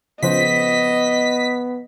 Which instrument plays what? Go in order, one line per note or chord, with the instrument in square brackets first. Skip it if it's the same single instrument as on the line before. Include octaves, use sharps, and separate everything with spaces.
[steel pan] C#3 F3 C5 [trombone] B3 [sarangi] D#5 [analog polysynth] B6